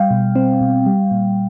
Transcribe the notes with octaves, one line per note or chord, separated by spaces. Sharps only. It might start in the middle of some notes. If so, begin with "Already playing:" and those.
Already playing: G3 F5 G5
B2
C4
B2
G3
A#2